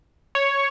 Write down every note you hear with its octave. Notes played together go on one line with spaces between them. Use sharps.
C#5